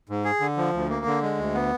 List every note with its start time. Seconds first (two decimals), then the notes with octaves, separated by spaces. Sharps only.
0.09 G#2
0.25 G#4
0.40 D3
0.57 F3
0.73 D2
0.90 A#3
1.06 D3
1.22 G#3
1.37 D2
1.55 B3